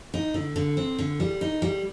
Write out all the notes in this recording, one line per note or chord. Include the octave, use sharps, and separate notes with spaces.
D#4
D3
D3
C4
D3
G3
D#4
G3